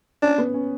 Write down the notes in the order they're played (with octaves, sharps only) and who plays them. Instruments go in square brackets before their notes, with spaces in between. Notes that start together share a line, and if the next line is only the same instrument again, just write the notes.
[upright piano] C#4 [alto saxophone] D4
[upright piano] B3
C#4